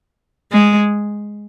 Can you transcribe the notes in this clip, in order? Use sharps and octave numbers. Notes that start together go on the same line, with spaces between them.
G#3